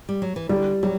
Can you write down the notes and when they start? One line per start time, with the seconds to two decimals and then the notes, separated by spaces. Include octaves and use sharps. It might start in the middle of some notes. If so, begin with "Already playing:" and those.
0.09 G3
0.22 F#3
0.36 E3
0.49 D3 G3
0.83 F#3 G3